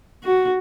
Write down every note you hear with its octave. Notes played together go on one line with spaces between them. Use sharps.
F#4